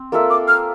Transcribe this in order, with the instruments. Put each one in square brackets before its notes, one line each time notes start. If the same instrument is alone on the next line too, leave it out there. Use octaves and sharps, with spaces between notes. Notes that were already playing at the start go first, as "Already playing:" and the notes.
Already playing: [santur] C4
A#3 F4 A4 E5
[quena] D6
F6